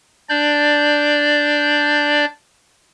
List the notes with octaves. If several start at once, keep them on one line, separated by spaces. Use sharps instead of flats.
D4 D5 G6